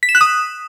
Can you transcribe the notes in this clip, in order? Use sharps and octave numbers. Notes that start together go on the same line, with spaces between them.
B6
E7
F#6
D#6